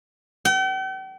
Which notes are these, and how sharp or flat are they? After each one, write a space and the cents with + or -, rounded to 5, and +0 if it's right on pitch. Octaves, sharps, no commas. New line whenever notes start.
G5 -45